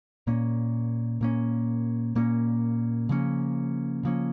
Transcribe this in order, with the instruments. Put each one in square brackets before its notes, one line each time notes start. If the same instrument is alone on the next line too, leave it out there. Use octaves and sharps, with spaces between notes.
[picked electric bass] A#2 A#3 C#4
A#2 A#3 C#4
A#2 A#3 C#4
C#3 F3 A#3 C#4
C#3 F3 A#3 C#4